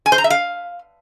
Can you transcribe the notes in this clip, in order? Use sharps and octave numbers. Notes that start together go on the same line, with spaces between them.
G#5
C5
A#5
E5
F5